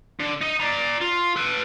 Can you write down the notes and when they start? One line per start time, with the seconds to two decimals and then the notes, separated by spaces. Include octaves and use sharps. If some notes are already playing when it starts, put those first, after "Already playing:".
0.20 D3
0.41 D#4 D#5
0.60 D5 A#5
1.02 F4
1.36 A4 B4